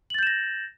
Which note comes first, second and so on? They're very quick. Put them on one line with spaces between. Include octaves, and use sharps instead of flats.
F#7 A6 G6 E7 A#6